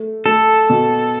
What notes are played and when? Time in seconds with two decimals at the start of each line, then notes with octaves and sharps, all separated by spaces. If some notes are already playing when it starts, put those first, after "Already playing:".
Already playing: A3
0.26 A3 A4
0.70 B2